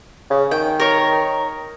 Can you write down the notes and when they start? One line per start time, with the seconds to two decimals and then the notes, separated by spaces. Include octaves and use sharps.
0.30 C#3
0.51 D#3 G5
0.80 A#4 C#5